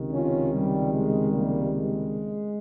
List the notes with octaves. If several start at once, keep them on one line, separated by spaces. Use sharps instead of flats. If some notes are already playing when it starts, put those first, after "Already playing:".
Already playing: C#2 C3 D#3
C#4 F4
G3
G#3
G3 A#3
G#3